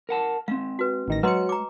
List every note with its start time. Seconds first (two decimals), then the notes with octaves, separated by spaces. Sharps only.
0.09 A#4 F#5 A5
0.48 G#3 C4 F5
0.79 F#4 B4
1.08 A1 D#3 A#6
1.23 F#3 G#3 B4 D#5 C6 C#7
1.49 A#5 D6